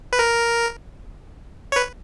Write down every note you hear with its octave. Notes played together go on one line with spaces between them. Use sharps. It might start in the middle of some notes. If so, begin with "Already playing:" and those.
B4
A#4
C#5
B4